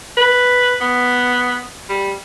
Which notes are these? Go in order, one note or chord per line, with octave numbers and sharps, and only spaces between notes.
B4
B3
G3